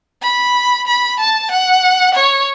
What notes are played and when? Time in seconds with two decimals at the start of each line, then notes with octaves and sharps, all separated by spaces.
0.23 B5
0.87 B5
1.20 A5
1.51 F#5
2.14 C#5